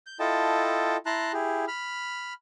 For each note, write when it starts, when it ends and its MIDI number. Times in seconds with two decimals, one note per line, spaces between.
0.06 0.18 91
0.20 0.97 64
0.20 0.97 65
0.20 0.97 69
0.20 0.97 75
0.20 0.97 79
0.20 0.97 81
1.06 1.32 64
1.06 1.32 81
1.06 1.32 82
1.06 1.32 84
1.06 1.32 90
1.33 1.65 64
1.33 1.65 67
1.33 1.65 68
1.68 2.33 83
1.68 2.33 89